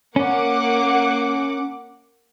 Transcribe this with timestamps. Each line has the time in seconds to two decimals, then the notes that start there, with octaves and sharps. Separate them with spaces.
0.16 A#3 C#4 F#5 D6